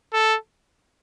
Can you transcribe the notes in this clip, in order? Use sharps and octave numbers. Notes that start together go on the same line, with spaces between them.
A4